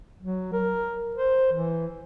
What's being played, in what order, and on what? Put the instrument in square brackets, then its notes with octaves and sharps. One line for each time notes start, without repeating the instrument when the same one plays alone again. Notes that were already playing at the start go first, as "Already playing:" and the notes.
[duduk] F#3
A#4
C5
E3